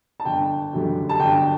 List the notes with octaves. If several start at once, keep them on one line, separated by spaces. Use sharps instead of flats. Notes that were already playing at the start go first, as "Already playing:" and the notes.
A5
G1 G5
F#2 D3 G3
A5
G1 G5